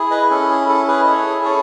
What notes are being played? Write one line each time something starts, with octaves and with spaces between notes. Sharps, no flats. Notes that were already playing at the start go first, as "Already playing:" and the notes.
Already playing: E4 G#4
B4 D#5
C#4 A4
G#4
E4 A4
G#4 B4
D#5
G#4 A4 C#5
C#4 A4 C#5